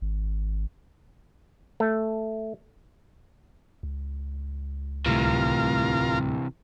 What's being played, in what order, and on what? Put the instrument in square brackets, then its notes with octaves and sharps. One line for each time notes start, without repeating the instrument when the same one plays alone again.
[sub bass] G#1
[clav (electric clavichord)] A3
[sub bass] C#2
[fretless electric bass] D1 C2 A3 [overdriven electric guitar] C3 E3 [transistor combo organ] F4 A#4